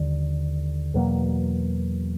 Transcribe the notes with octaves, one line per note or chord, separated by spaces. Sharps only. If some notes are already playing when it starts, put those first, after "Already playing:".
Already playing: D#2 D3 G3
E2 B2 F#3 A#3